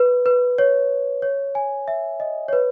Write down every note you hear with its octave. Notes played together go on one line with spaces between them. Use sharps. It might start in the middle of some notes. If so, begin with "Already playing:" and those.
Already playing: B4
B4
C#5
C#5
G#5
E5
D#5
C#5
B4